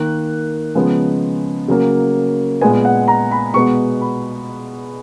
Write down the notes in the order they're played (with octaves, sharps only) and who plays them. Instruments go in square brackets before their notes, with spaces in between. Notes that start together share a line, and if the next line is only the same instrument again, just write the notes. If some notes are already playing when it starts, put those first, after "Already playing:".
Already playing: [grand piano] D#3 A#3 F#6
C#3 F3 G#3 B3
C#3 F#3 A#3
A#2 G#3 B3 G#5
F#5
A#5
B5
B2 G#3 B3 C#6
B5